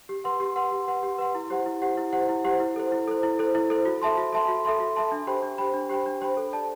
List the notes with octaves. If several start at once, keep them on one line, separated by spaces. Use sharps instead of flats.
G4
B4 F#5 C6
G4
B4 F#5 C6
G4
B4 F#5 C6
G4
B4 F#5 C6
E4
G4 C5 F#5
E4
G4 C5 F#5
E4
G4 C5 F#5
E4
G4 C5 F#5
E4
A4 C5
E4
A4 C5
E4
A4 C5
E4
A4 C5
F#4
A4 E5 A5 C6
F#4
A4 E5 A5 C6
F#4
A4 E5 A5 C6
F#4
A4 E5 A5 C6
D4
G4 C5 G5 B5
D4
G4 C5 G5 B5
D4
G4 C5 G5 B5
D4
G4 C5 G5 B5
A4
D5 A5